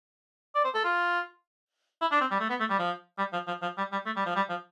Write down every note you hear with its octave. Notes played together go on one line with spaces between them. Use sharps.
D5
C5
A4
F4
E4
D4
C4
G3
A3
B3
A3
G3
F3
G3
F3
F3
F3
G3
G3
A3
G3
F3
G3
F3